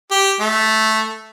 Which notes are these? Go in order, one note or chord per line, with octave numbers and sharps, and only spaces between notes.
G4
A3